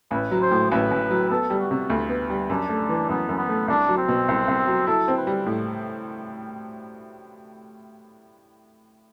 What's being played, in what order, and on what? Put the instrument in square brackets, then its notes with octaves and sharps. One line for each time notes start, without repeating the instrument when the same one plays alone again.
[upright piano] A1 [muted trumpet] B4
[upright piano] F#3
[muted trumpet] C5
[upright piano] A2
[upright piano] A1 [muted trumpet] B4
[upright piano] A1
F#3
[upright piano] B3 [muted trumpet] A4
[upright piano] G3
[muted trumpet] F#4
[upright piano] C3
D2
B3
G3
[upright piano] F#2 [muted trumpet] D4
[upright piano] A3
E3
[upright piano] F#2 [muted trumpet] B3
[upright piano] F#2
[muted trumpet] B3
[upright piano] A3
[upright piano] C2 [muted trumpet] D4
[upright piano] F#3
[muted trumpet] C4
[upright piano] B2
C2
C2
F#3
[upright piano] E4 [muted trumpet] A4
[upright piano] C4
[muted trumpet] B4
[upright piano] G3
A2